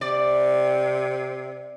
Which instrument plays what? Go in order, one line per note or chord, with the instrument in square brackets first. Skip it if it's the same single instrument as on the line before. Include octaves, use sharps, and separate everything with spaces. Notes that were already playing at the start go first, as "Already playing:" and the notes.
[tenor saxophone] C3 [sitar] D5